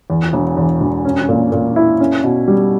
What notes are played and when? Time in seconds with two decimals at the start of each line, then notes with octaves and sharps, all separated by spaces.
0.10 E2
0.33 E1
0.57 E2
0.81 E1
1.05 C#4
1.29 A#2
1.52 A#2
1.76 E4
2.00 C#4
2.24 B2
2.48 G3